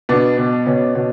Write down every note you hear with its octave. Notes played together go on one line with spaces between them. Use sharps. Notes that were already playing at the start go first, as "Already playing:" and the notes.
B2 B3 D4
B2
B2 C#4
B2